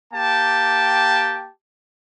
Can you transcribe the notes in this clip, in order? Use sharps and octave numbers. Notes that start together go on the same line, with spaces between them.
A#3 G4 G5 A5